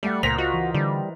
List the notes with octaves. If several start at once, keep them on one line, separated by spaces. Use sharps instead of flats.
G3 A3 D5 F#5
C#2 A#2 A#4 C5 A#6 B6 F7
F4 F#4 D#5
E3
D3 G3